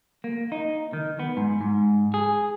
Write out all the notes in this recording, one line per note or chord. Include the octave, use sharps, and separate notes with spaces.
A#3
D#4
D#3
B3
G#2
G#2
G#4